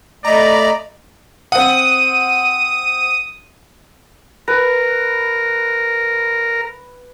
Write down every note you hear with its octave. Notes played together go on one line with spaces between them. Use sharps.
A3 D5 D#5 A#5 B5
C4 F#5 D#6
A#4 B4